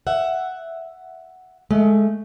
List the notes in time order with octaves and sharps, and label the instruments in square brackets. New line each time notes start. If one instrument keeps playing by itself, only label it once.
[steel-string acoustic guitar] E5 F#5
G#3 A3